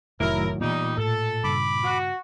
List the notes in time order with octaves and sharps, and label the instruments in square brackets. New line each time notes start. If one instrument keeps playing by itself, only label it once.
[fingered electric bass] F1 [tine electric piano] A2 D#3 F#3 [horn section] E4 A#4
[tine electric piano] A#2 [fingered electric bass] E3 B3 [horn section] G3 D#4
[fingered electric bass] A2 [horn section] A4
[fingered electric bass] G2 C#3 [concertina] B5 D6
[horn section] F#4